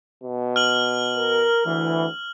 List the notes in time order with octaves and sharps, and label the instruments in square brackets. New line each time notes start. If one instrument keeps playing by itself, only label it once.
[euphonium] B2
[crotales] F6 F#7
[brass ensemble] A#4
[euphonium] D2 [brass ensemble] E3